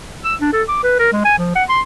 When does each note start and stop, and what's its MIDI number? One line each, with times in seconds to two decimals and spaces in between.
0.24 0.35 88
0.40 0.51 62
0.53 0.63 69
0.68 0.80 86
0.83 0.95 71
0.99 1.09 70
1.13 1.22 56
1.25 1.35 80
1.39 1.51 53
1.56 1.64 78
1.69 1.81 84